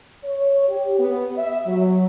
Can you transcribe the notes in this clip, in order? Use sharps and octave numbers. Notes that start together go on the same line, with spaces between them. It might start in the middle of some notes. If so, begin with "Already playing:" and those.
C#5
G4
B3
E5
F#3